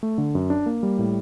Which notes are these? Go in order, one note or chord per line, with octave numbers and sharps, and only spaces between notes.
A3
D3
F#2
D4
A#3
G3
A2